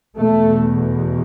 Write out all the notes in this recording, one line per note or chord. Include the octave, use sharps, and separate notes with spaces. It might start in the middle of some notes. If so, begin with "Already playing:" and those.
E2 B2 A3